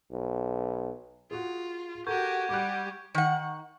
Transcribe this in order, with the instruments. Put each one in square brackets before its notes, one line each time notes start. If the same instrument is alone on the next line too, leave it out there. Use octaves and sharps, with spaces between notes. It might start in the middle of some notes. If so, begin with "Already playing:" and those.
[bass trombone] B1
[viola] F4 [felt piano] F#4 G#4
[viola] F#4 G4 [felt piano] A4 A#4 [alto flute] F#5 [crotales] C#6 G6 G#6
[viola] G3 G4 [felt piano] D6 F#6
[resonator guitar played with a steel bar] D#3 F#5